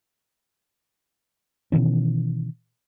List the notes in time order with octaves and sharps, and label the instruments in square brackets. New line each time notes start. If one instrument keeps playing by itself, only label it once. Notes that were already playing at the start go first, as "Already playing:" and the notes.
[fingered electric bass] B2 D#3 E3 C#4